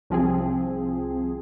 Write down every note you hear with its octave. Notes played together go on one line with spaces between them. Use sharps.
C2 F3 C4 G#4